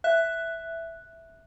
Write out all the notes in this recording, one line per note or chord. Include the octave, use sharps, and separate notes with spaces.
E5 F#6